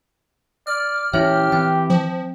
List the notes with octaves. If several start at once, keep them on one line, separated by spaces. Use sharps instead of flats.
D5 F6
A#2 E3 C#4 E4 G4 C#5 E5
E3 C4 G5
F3